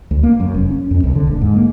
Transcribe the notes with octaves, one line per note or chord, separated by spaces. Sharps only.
D2
A#3
F#2
F1
C#4
F2
C2
D3
D#1
G#2
A#3